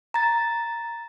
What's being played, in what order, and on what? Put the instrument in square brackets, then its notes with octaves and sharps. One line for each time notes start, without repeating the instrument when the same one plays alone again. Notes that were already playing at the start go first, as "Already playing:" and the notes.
[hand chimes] A#5 A6